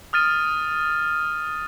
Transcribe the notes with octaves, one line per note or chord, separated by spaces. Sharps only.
D#6 F6 A6 D#7